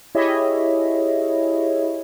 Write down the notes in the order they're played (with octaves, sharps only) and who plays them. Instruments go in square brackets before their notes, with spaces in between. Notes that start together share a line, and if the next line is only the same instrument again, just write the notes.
[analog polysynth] E4 G4 G#4 C#5 D#5 E5